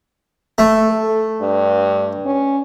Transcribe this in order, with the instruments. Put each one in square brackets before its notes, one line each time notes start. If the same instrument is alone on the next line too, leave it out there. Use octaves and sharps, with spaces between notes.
[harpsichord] A3
[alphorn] A4
G2
C#4